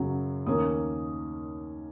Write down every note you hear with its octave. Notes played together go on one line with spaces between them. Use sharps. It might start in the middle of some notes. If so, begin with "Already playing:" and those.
Already playing: F#2 C#3 F#3
D#2 D#3 A#3 C#4 D#6